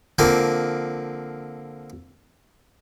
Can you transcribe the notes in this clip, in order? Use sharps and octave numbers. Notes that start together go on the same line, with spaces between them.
D3 F3 A#3 C4